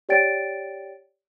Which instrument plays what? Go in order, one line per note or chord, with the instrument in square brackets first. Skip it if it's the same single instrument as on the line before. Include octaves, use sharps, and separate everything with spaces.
[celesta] G4 C#5 D5 G5 A6 D7